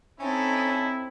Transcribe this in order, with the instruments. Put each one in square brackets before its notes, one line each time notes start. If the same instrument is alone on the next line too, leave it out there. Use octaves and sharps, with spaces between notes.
[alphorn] C4 [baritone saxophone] C#4 [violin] D#4 A4 [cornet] E4